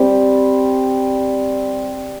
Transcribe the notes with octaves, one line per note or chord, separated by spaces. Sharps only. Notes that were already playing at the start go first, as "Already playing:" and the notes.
Already playing: G3 C4